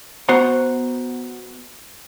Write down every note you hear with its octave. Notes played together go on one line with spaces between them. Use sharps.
B3 F#4 C5 F#5 A#5